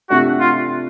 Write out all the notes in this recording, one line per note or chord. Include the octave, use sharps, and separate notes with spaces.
C3 F3 A3 D4 F#4 G4
F4